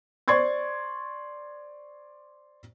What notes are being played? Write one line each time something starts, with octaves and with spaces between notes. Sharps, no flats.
C5 D5 C6 C#6 G#6 A6